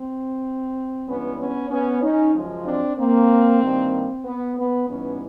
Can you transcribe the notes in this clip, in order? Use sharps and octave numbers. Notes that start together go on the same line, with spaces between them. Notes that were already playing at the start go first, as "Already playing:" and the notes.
Already playing: C4
G2 E3 G#3 B3 C#4
B3 C#4
B3 C#4
C#4 D#4
F#2 C#3 F3 G#3
C4 D4
A#3 C4
G2 D#3 G3 A#3
B3
B3
G#2 E3 G3 B3 C#4